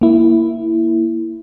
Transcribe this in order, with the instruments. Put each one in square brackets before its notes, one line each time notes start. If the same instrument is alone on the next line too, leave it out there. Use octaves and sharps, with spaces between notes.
[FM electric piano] A#3 E4